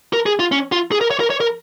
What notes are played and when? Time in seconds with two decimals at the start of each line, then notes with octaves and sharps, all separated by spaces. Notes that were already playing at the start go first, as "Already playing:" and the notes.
0.13 A#4
0.26 G#4
0.39 F4
0.52 C#4
0.72 F4
0.92 G#4
1.01 A#4
1.11 C#5
1.20 A#4
1.30 C#5
1.40 A#4